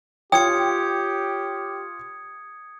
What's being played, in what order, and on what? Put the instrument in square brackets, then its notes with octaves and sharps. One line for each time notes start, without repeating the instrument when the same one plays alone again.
[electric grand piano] F4 C#5 [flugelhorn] G4 [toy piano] G5 [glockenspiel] D#6 G#6 C#7